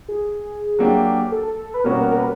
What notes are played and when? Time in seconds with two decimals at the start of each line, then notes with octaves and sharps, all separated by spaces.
0.09 G#4
0.79 F#3 A#3 D4 G4
1.32 A4
1.74 B4
1.84 B2 G3 A#3 C#4 F#4 A#4
1.98 A#4
2.11 A#4
2.18 B4